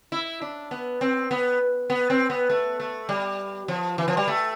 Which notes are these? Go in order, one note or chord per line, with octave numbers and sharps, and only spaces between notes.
E4
D4
B3
C4
B3
B3
C4
B3
A3
A3
G3
F3
E3
F3
G3
A3